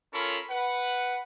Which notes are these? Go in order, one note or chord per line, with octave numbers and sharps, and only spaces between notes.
C#4 F4 A4 A#4 C#5 B5
B4 F#5